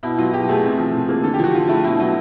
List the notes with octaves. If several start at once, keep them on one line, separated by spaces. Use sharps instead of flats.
B2 E4
F#3 F4
B2 G4
A3 G#4
C3
F3
C3
A#3
D3 A4
G4
F3
F#4
D3 F4
A3 E4
B2 E4
F#3 E4